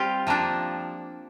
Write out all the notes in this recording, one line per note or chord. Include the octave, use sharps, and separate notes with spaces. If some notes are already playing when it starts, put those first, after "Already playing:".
Already playing: G3 C4 F4 G4
F3 A#3 D4